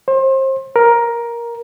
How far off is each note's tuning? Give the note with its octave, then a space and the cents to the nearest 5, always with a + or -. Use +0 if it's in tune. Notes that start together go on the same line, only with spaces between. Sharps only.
C5 +30
A#4 +10